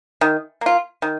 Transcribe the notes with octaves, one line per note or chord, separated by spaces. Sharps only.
D#3
A#3 F4
D#3